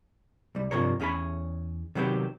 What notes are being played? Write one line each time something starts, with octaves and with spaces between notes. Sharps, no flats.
C2 G3
G2 C3 F3 A#4 C#5
E2 C#4 G#4 C#5 B5
C3 D#3 F#3 B3 C4 G4